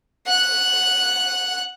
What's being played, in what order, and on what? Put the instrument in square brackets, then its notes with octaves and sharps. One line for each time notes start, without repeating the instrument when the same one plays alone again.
[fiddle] F#5 F#6